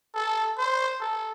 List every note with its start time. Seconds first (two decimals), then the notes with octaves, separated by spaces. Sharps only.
0.15 A4
0.58 C5
1.01 A4